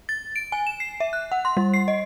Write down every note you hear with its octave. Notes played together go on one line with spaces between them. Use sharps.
A6
D7
G#5
E7
C7
E5
F#6
F#5
C6
G3
C7
D#5